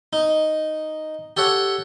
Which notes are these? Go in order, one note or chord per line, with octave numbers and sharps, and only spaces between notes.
D#4
G4 A4 C#5 F#5